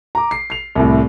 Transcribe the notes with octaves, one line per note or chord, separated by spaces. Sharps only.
A#5 D6
C7
C7 F7
C2 A2